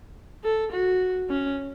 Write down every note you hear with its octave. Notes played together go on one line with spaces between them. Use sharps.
A4
F#4
C#4